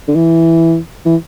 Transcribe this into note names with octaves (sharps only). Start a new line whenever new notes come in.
D3
E3
E3